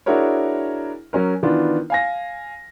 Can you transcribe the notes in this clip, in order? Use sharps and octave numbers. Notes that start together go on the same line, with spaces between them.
D4 E4 F#4 G#4 A#4 C#5
F#3 C#4 A#4
D#3 E3 B3 D4 F4
F5 G#5 A#6